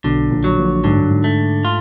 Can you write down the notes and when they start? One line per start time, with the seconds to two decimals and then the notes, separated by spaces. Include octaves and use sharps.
0.04 B1 B2 D3
0.31 A#1 A#2
0.44 F#3
0.58 A#1 A#2
0.84 G#2 D3
0.97 G2
1.10 G#2
1.24 A3
1.65 F4